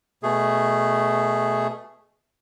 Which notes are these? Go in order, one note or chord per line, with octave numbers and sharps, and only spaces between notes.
B2 A3 G#4